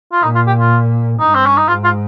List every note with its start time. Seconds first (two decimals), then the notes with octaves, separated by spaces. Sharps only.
0.12 F4
0.23 A#2 D#4
0.35 F4
0.47 G4
0.59 F4
1.20 G2 D#4
1.35 C4
1.46 C#4
1.57 D#4
1.67 G#2 F4
1.84 F4